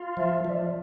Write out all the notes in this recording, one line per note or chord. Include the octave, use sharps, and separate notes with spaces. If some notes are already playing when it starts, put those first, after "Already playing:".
Already playing: F4
F3 E5
F3 D5 E5